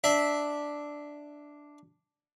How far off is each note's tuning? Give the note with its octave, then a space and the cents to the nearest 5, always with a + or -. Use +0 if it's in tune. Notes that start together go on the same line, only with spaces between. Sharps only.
D4 +0 E5 -10